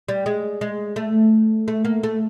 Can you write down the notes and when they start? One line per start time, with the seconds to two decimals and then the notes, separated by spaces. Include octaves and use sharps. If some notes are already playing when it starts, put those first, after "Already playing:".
0.09 G3
0.26 G#3
0.61 G#3
0.96 A3
1.68 A3
1.85 A#3
2.03 A3